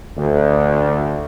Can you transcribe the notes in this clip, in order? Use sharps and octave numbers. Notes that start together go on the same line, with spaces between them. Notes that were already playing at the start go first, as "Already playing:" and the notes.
D2